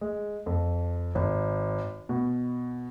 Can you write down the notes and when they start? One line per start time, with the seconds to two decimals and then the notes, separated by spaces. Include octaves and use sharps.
0.01 G#3
0.46 F2
1.15 G#1
2.09 B2